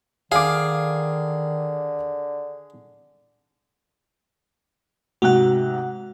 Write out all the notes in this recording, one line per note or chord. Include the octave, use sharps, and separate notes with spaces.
D3 D#3 G#4 F5 D6
G#2 C3 F#4 F#5 F#6